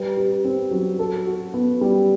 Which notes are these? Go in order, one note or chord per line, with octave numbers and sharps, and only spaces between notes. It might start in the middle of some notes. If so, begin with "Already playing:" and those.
Already playing: G3 B4
G4
C4
F#3
A4
F#4
B3
G3